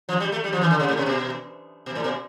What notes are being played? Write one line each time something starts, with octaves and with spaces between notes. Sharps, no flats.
F3
G3
A3
G3
F3
E3
D3
C3
A2
C3
B2
B2
A2
B2